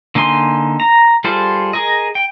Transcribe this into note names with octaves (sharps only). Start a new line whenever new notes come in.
D3 A#3 D#4 G#5 C6
A#5
G3 F4 G#4 A4 C5
G#4 A#4 D#5
G5